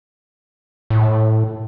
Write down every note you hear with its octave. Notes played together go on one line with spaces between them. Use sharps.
A2